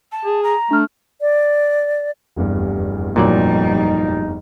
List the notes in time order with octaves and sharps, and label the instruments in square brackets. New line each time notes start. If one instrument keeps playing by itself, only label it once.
[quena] A5
[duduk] G#4
[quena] A#5
[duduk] A3 [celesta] D4 F6
[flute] D5
[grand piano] F1 E2 G2
[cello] F2 G3 [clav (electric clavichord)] A#2 F#3 D5 [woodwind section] D#4